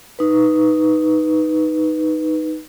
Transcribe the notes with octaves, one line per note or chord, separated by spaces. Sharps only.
D#4 B4